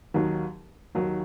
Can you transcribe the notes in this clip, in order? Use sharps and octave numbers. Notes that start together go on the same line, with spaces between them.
D#2 D#3 F#3
D#2 D#3 F#3